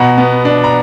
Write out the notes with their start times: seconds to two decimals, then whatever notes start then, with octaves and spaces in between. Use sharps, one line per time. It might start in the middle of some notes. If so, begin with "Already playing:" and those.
Already playing: B2 F#5 A#5
0.18 B3
0.45 D4
0.64 A#5